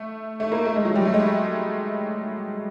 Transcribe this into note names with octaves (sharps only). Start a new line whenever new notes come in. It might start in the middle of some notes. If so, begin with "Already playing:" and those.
Already playing: A3
A3
A#3
A3
G#3
F#3
G3
A3
G#3